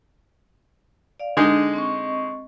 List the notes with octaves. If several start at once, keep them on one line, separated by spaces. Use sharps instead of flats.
D5 F5
D3 G#3 D4 D#4
C4 D#5 C#6